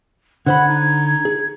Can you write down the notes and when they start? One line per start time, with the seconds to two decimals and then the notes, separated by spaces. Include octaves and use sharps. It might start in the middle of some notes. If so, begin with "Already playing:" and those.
0.47 D3 C5 F#5 B5 G#6
0.68 D#4
1.25 G#4